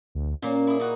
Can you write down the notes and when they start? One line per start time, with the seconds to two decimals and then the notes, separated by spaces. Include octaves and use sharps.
0.15 D2
0.42 A#2 A#3 C#4
0.67 E4 G#4
0.80 D#4 F#4